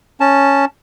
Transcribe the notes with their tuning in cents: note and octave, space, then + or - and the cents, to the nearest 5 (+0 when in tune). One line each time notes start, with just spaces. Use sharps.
C#4 +0 A5 +0